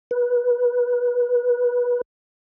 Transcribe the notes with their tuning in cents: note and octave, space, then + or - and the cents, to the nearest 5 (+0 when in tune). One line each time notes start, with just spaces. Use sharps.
B4 -20